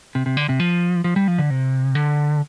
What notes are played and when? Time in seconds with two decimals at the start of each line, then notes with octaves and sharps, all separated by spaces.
0.15 C3
0.26 C3
0.37 D3
0.49 C3
0.60 F3
1.04 F3
1.16 G3
1.28 F3
1.38 D3
1.50 C3
1.95 D3